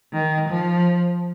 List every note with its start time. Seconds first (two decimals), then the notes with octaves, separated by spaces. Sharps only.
0.13 D#3
0.49 F3